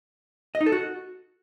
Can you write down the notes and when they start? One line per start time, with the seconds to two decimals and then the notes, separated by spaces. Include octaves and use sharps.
0.55 D#5
0.61 D#4
0.66 A4
0.72 F#4